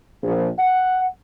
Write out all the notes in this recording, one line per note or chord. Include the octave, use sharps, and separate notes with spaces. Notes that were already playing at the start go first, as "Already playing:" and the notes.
A#1
F#5